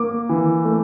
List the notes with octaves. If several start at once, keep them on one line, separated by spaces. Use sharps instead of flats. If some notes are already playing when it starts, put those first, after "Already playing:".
Already playing: A#3 D6
E3
A3